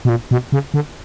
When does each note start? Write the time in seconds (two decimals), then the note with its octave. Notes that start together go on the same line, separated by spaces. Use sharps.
0.05 B2
0.09 A#2
0.31 B2
0.52 C#3
0.74 D3